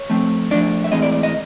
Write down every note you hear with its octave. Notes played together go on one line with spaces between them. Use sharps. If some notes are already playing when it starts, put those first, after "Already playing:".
Already playing: C#5
F3 A3 C4
F3 A3 D4 D5
E5
A2 E3 G#3 C4 D#5
D5
D5
D#5